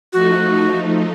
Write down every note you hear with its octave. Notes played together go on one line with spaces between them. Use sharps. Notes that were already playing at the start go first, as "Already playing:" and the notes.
F3 A3 D#4 F#4